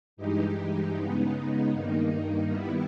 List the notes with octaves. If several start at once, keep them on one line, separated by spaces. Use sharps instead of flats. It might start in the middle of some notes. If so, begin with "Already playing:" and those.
G2 E3 G#3 D#4 G4
C#3 G#3 B3 D#4
G2 D#3 A#3 D#4
D#3 G3 B3 E4